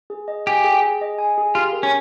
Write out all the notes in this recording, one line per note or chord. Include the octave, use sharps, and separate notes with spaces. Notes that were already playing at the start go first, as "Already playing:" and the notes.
G#4
D#5
G4 G#5
G#4
G#4
D#5
G#5
G#4
F4 G4
A#4
C#4